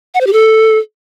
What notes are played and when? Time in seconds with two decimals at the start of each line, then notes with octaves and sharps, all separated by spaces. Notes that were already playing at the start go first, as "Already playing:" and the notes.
0.14 F#5
0.21 C5
0.27 G4
0.33 A4